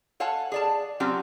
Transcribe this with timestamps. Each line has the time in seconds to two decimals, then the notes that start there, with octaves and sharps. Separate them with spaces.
0.20 A4 C#5 F5 F#5 G#5 A5
0.52 G#4 D5 A5
1.00 F#3 C4 C#4 F4 G4